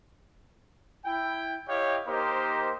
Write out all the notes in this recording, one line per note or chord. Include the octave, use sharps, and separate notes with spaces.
E4 G5
E4 G4 C#5 D#5 F5 G5
A#3 D#4 G4 A#4 C5